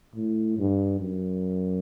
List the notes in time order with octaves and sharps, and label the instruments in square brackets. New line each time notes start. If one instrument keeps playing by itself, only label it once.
[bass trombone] A2
G2
F#2